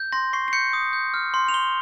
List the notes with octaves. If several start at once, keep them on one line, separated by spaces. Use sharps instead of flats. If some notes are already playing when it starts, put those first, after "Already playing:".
Already playing: G6
C6 A#6
C#6 C7
C7
G6 C#7
D#6
G6
F6
C6
F7
C6 G7